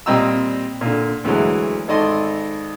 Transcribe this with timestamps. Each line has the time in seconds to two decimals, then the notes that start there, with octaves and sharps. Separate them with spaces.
0.06 A#2 G3 C4 D#5 A#5 E6
0.81 A#2 D3
1.24 D2 E3 F#3 G#3
1.88 G#1 A4 D5 D#5 C6